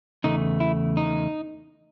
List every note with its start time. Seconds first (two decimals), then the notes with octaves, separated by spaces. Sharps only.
0.24 E2 C#3 A3 D#4
0.60 E4
0.97 D#4